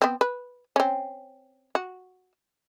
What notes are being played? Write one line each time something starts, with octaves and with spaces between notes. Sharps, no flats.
B3 C4
B4
C4 C#4
F#4